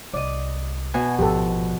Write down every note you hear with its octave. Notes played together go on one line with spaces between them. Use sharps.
C2 D5 D#5
B2 G#5
A1 G#2 F3 G4 A4